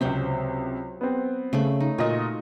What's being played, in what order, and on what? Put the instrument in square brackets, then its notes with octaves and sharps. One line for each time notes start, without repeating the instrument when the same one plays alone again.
[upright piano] C#2 C3 [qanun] F#3 C5 E5
[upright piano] B3 C4
[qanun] C#3 A3 B5
D#4
[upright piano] A#2 D#5 [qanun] F4 F#4